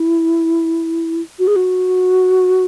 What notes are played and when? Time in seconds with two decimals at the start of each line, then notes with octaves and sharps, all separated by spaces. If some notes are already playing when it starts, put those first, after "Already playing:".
Already playing: E4
1.39 F#4
1.47 G#4
1.56 F#4